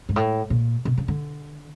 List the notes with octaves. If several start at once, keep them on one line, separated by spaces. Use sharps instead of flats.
G#2
A2
A#2
B2
C#3
D3